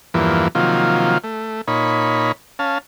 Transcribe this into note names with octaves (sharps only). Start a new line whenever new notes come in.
E2 G2 E3 F3 A#3
C3 D#3 F3 F#3 A#3 F4
A3
A#2 D#4 C#5 B5
C#4 F5 A5